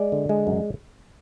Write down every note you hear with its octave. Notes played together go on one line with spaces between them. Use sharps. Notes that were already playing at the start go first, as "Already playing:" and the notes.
Already playing: G#3 D5
D3
G#3
F#2